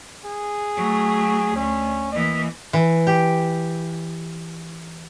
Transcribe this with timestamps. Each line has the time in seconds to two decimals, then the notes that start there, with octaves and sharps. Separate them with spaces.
0.25 G#4
0.76 F#3 A3
1.56 D2 C#4
2.12 E3 A#3 D#5
2.73 E3
3.07 G4